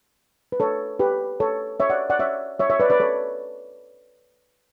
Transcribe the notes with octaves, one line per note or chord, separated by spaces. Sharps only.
B4
A4 C#5
G4 B4
A4 C#5
C#5 E5
D5 F#5
D5 F#5
C#5 E5
C#5 E5
C#5 E5
B4 D5
B4 D5
A4 C#5